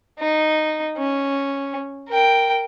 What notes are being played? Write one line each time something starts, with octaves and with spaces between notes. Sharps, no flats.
D#4
C#4
A#4 G5